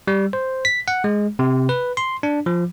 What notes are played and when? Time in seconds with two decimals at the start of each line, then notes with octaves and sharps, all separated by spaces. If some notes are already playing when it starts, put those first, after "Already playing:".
0.07 G3
0.33 C5
0.65 B6
0.88 F#5
1.04 G#3
1.39 C3
1.69 B4
1.97 C6
2.23 D4
2.46 F3